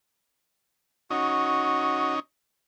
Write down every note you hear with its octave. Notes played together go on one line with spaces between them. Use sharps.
C#4 D#4 F#4